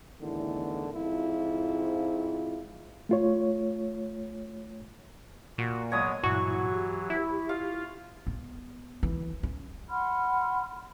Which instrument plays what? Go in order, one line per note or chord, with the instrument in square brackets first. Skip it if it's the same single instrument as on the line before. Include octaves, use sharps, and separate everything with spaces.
[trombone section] E2 A2 D3 D#3
F2 G#2 E4 F4
[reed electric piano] A3 F4 C#5
[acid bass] A#2 [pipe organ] F#4
[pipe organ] F#3 G#3 B3 [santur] C#5 D#6 [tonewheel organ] D#5
[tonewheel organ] G2 A#2 E4 [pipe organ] E3 F#3 [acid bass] F#4 [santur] C#6
[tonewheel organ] G4
[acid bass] E4
[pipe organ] F4 [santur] F5
[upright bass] B3
E3
C#4
[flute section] F#5 B5 C6 F6